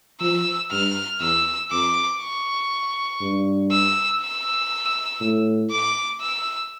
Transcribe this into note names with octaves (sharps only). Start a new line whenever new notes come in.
F3 E6
G2 F6
E2 E6
F2 D6
C#6
G2
E6
E6
A2
D6
E6